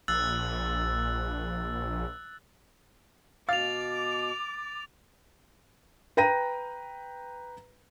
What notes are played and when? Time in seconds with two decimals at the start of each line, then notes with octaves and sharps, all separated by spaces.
0.08 A#1 E6 F#6 A6
3.49 B2 F5 D6 A6 F7
6.17 B4 G5 A#5 A#6 D#7